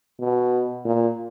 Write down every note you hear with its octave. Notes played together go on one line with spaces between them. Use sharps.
B2
A#2